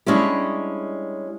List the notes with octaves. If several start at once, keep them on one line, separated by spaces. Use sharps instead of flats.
G3 G#3 C#4 D4 E4 G4